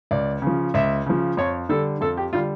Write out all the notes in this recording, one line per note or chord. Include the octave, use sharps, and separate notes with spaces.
C#2 D5
C#3 F3
C#2 E5
C#3 F3
F2 C#5
D3 G3 A4
F2 A4
G4
D3 G3 F4